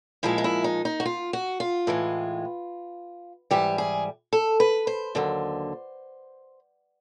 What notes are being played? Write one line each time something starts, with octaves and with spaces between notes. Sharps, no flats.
A#2 F3 G#3 E4
D#4
E4
D#4
D#4
F#4
F4
F#4
F4
A2 E3 G#3
G#2 E3 G3 G4
G#4
A4
B4
C5
D#2 D3 F#3